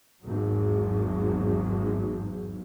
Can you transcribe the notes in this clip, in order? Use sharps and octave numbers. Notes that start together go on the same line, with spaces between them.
G#1 E2 G#2 F#3